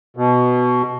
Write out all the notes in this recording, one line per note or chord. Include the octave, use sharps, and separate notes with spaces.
B2